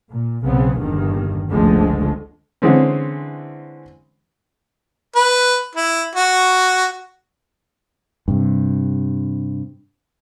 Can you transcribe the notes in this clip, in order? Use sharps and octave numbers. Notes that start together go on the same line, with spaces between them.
A#2
B1 C#3 B3 C4
G1 E2 G2 A#2 D#3
F#1 C#2 D3 F3 G#3 A3
D3 E3 G#3 C4 C#4
B4
E4
F#4
G2 C3